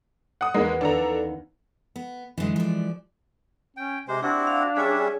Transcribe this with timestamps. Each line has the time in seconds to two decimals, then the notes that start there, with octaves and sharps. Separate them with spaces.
0.41 F#5 D#6
0.54 E2 G#3 A#3 B3 C#4 D#4
0.81 D#2 D4 A4 A#5
1.96 B3
2.38 F#2 D3 E3 G#3
2.56 F3 D5
3.77 C#4 G5
4.08 C3 G#3 C5
4.23 C4 D4 E4 F#4 G4
4.47 F5
4.77 G3 C#4 G#4 C#5 E5 G#5